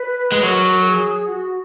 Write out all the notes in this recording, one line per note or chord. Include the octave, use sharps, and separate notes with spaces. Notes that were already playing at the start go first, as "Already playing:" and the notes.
Already playing: B4
G#3
F#3 A#4
G#4
F#4